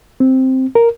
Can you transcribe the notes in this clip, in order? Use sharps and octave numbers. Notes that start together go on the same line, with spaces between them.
C4
A#4